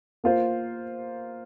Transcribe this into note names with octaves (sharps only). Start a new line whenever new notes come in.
A#3 F4 C5